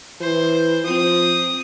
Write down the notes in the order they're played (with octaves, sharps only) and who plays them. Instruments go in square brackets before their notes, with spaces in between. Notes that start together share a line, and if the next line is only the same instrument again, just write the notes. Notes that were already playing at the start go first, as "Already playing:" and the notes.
[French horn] E3 [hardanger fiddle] C5
[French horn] F3 [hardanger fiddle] C4 D#6